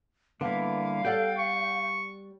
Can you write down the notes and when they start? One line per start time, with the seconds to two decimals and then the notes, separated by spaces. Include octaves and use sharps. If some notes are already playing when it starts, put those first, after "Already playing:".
0.41 D3 G3 A#3 B3 E4 F5
1.05 G3 A4 D5 F#5 G5
1.38 C#6